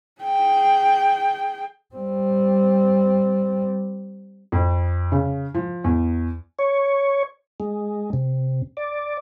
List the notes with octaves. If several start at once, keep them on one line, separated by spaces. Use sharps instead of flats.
G#4 G5
G3 C4
F2
C#3
F3
E2
C#5
G#3
C3
D5